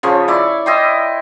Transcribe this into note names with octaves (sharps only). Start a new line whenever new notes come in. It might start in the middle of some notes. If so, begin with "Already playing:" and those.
C#3 F3 C#4
E4 D5 C#6
E4 D#5 G5 C6